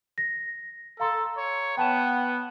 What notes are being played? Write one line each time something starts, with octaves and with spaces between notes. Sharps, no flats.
A#6
A4 F5 A#5 C6
C#5
B3 G5 A5 E7